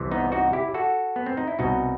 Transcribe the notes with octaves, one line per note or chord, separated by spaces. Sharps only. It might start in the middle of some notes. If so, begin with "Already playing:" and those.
Already playing: C2 C3 E3
B3 D#4
D#4 F#4
E4 G4
F#4 A4
B3
C4
D#4
E4
C2 B2 D#4 F#4